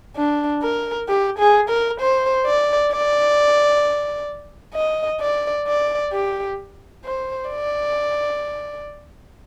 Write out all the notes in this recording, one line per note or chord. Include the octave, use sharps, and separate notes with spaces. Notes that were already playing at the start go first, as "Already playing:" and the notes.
D4
A#4
G4
G#4
A#4
C5
D5
D5
D#5
D5
D5
G4
C5
D5